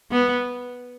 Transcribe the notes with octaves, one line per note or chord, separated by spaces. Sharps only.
B3